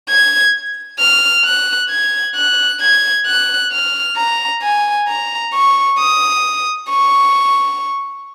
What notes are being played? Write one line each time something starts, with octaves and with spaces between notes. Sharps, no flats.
G#6
F6
F#6
G#6
F#6
G#6
F#6
F6
A#5
G#5
A#5
C#6
D#6
C#6